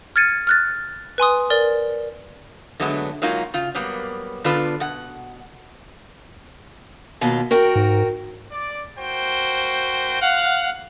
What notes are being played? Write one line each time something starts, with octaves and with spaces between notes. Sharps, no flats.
F6 G#6 A6 C#7 D#7
F6 F#6 A6
B4 G#5 C6 D#6
A#4 D5 G7
D3 F#3 G#3 A3 B3
F#3 G#3 A#3 D#4 F4 F#4
C#3 F4
F#3 G3 A#3 B3
D3 B3 D4 F4 A4 B4
B2 F#5
D#2 B2 F4
F#4 A#4 G5
G#2
D5
A#3 F#4 C5 G5
F5 F#5